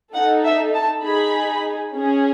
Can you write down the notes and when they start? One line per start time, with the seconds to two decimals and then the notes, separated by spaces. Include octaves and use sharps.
0.14 D#4 A4 F#5
0.45 E5
0.74 A5
1.04 D#4 G#4 B5
1.96 C#4 G#4